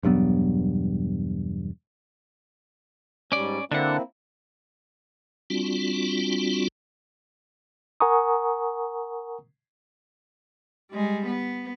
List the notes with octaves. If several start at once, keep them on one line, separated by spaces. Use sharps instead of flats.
E1 G2 F#3 B3
G#2 G3 C#4 D5
D3 A#3 C4 D4 E4 F#5
G3 C4 D4 F4 F#4
A#4 F#5 G#5 A#5 C#6 D#6
G3 G#3
B3